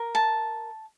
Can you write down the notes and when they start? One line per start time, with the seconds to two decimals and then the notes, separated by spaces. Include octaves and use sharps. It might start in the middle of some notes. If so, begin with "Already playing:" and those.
Already playing: A#4
0.15 A5